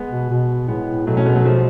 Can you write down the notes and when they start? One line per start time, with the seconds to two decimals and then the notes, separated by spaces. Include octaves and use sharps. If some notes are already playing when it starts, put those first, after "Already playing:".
Already playing: G#3 B3
0.11 B2
0.30 B2
0.68 A2 G#3 B3
1.07 B2 F#3 A3
1.17 A3 C#4
1.26 G#3 B3
1.36 F#3 A3
1.45 F3 G#3